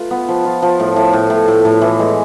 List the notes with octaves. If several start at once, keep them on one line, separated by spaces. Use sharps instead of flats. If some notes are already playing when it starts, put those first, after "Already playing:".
Already playing: A3 F4 B4
B3
F3
F4
F3
A2
A2
A2
A2
A2
A2
E3
G#3